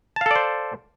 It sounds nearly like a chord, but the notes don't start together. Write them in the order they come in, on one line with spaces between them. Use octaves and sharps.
A5 F5 A4 D5 C5